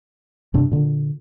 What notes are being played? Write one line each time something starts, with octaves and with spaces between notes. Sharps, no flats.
G2 C3 D4
A#2 D3